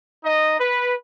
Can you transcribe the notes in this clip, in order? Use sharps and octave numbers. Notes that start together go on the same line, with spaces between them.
D#4 D#5
B4